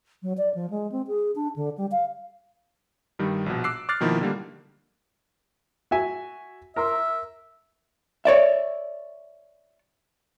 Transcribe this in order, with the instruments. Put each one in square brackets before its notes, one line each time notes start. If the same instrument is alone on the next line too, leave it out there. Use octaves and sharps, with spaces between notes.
[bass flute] F#3
D5
F3
G#3
C4
G#4
D4
D3
G3
F5
[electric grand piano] G2 D#3 G3
A#1 B2
D6 E6 F#6 C7
D6 F6 F#6 A6 C7
B2 D#3 F3 A#3 D#4 E4
D3 G3 A#3
[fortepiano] F#4 E5 G#5
[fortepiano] A#4 A#5 C6 [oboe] E5
[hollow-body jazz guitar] C#5 D5 E5